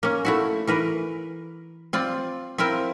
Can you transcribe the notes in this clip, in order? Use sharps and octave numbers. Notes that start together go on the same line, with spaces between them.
A#3 C#4
A3 E4 F#4
E3 A#4 B4
C4 F4 D5
C4 E4 F4 A#4